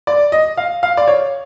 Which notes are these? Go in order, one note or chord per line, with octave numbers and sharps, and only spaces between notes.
D5
D#5
F5
F5
D5
C#5